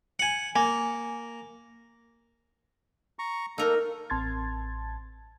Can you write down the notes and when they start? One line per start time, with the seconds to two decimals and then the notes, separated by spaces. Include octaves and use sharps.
0.19 F#5 G#5
0.56 A#3 G#5
3.19 A#5 C#6
3.58 A#3 D#4 A4 A#4
4.10 A1 C4 A5 C6 G#6 A6